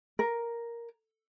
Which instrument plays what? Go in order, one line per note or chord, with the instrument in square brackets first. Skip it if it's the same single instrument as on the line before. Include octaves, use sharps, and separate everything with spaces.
[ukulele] A#4